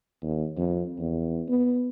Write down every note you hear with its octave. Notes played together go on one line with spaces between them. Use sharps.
D#2
F2
E2
B3